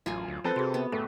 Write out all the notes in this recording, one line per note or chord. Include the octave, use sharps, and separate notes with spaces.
A1 F#2 F4 G#5
D2
F3 C4 A4 B4
C3 F#4 G#4
B3
D1 A3 A4